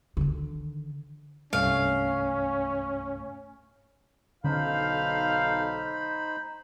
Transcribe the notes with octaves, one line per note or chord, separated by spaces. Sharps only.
D3 D#3
C2 G2 A3 C#4 F5
B1 D3 C#4 D#4 A4 C5 F5 B5